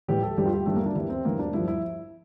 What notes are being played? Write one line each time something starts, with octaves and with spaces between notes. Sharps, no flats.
A2 E3 G3 G4
A4
G2 E3 G3 G4
F4
G4
G2 E3 G3 A3
A#3
D4
G2 E3 G3 E4
C4
G2 E3 G3 A#3
D4
G2 F3 E4
E4